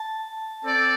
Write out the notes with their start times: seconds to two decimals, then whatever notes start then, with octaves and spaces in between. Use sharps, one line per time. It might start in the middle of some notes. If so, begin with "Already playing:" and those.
Already playing: A5
0.65 C4 A4 D5